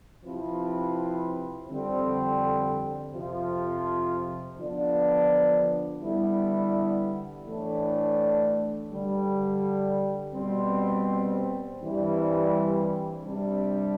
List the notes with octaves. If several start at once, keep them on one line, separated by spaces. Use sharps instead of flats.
C3 F3 C4 E4 B4
F2 D3 G3 C4
F2 C3 F3
D3 F3 B3 D4
D3 G3 B3 E4
A2 E3 A3 D4
G2 D3 G3
B2 G3 C4
G2 E3 G3 C4
C3 G3 D4